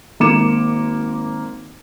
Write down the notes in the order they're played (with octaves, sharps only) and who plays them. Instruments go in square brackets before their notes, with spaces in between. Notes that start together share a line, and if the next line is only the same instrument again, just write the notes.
[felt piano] G#1 A#3 D6 C#7 E7